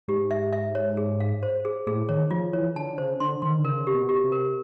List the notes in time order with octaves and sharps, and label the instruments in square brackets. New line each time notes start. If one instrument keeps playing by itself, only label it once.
[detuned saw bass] G#2 [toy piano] G4
[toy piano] E5
E5
C#5
G#4
F5
C5
G#4
[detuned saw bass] A2 [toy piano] G#4
[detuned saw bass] D#3 [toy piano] C#5
[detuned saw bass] F3 [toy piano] F4
[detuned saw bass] E3 [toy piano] C#5
[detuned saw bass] D3 [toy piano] A5
[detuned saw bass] C#3 [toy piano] C5
[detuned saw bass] D3 [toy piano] C6
[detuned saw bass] D#3 [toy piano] C6
[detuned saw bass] D3
[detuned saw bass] C#3 [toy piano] A#4
[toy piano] G4
[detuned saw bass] B2
[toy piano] G4
[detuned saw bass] C3
[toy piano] A#4